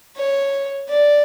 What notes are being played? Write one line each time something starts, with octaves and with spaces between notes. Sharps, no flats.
C#5
D5